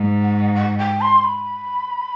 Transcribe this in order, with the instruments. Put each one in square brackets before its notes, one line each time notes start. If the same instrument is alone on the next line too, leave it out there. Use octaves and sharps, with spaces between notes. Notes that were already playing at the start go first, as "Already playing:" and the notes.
Already playing: [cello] G#2
[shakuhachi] F#5
F#5
G5
C6
B5